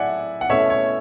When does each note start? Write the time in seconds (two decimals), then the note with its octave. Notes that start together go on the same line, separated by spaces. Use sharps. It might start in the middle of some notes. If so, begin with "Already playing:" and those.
Already playing: A2 F#3 D5 E5 F#5 G#5
0.41 F#5
0.50 B2 A3 C#4 E4 C#5 E5
0.70 C#5